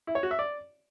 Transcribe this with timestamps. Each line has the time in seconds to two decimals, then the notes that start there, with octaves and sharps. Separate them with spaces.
0.07 E4
0.15 C#5
0.23 F#4
0.31 E5
0.39 D5